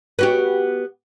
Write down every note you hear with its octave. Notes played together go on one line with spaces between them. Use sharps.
B3 F#4 G4